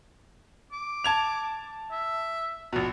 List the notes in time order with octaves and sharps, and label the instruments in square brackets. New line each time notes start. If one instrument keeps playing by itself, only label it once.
[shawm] D6
[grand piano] A5 G#6 F7
[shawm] E5
[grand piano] A#1 B2